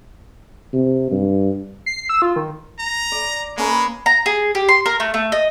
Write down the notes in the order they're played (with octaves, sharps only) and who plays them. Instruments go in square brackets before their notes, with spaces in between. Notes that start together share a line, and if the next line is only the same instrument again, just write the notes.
[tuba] C3
G2
[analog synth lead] C7
E6
F4
D#3
[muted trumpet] A#5
[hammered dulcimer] D5
[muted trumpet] G#3 [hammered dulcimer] A#3 C#4 B4
[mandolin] A#5
G#4
G4
C6
A#4
A3
A3
D#5